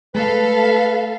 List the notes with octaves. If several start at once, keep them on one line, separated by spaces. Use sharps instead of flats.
G#3 A3 A4 B4 F5